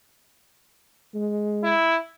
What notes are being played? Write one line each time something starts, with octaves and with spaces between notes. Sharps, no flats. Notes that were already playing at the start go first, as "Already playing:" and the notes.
G#3
E4